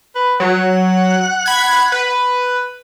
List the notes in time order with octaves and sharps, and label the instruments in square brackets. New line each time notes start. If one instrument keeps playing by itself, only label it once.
[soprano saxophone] B4
[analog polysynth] F#3 [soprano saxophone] F#5
[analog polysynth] B5 G#6
B4